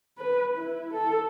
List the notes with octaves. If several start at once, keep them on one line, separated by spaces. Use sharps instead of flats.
B4
E4
A4